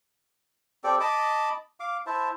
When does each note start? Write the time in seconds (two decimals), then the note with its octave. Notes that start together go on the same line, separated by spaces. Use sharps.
0.84 C4 G4 A4 D5
1.00 D#5 A5 B5 D6
1.80 F5 D6
2.06 E4 C5 E5 A5